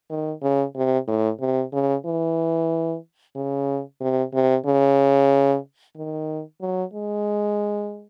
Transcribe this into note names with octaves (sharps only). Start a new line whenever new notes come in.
D#3
C#3
C3
A2
C3
C#3
E3
C#3
C3
C3
C#3
D#3
F#3
G#3